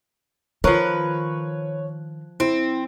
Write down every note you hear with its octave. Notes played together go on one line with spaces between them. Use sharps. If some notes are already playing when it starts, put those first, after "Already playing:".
D#3 F3 A#4 B4 C#5 C#6 F#6
C4 E4